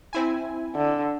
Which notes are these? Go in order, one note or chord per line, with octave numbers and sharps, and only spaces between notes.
C4 E4 G#5
D3